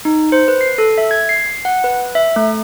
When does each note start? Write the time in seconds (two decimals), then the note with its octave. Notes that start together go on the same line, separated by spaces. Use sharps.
0.05 D#4
0.32 C5
0.48 B4
0.61 C7
0.78 A4
0.98 E5
1.11 G#6
1.29 C7
1.65 F#5
1.84 B4
2.15 E5
2.36 A3